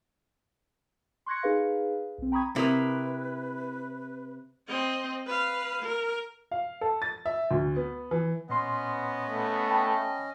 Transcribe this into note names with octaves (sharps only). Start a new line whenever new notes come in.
C6 C#6 F#6 G#6 A#6 C#7
D#4 G#4 B4 F5
B1 C4
G5 A#5 B5 C#6 D#6 G#6
C3 E4 A#4 B4 D#6
C4 D#5
B4 F5
A#4
F5
A4
A6
E5
D2
B3
E3
A#2 B3 C#4 D#5 C6
A3
G5 A5 B5